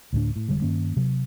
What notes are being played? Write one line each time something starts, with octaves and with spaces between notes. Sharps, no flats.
D2 A2 A#3 D4
A2
F1 D3 G3 G#3
G2 D#3 A#3 C#4
C3 F#3